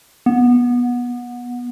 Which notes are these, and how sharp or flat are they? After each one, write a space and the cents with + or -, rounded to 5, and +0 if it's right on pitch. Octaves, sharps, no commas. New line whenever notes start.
B3 -20